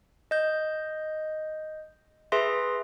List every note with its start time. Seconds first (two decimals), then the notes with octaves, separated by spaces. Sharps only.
0.31 D#5 G6
2.32 G#4 B4 E5 C6 A#6